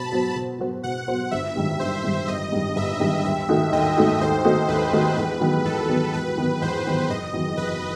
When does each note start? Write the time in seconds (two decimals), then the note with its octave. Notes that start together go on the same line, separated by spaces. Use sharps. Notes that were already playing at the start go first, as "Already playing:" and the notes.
Already playing: B2 F#3 C5 A5 B5
0.12 F#3 B3 F#4 C5
0.35 B2
0.59 F#3 B3 F#4 C5
0.83 B2 F#5
1.08 F#3 B3 F#4 C5
1.31 G1 E5
1.56 G2 D#3 G3
1.79 G1 C5
2.04 G2 D#3 G3
2.27 G1 D#5
2.52 G2 D#3 G3
2.76 G1 E5
3.00 G2 D#3 G3
3.24 D#2 E5
3.49 D#3 A3 D#4 F#4
3.72 D#2 D#5
3.97 D#3 A3 D#4 F#4
4.20 D#2 C5
4.45 D#3 A3 D#4 F#4
4.68 D#2 B4
4.93 D#3 A3 D#4 F#4
5.17 E2 B4
5.41 D#3 F#3 B3
5.65 E2 A4
5.89 D#3 F#3 B3
6.14 E2 B4
6.38 D#3 F#3 B3
6.62 E2 C5
6.85 D#3 F#3 B3
7.10 F#1 D#5
7.34 E2 D#3 F#3
7.57 F#1 B4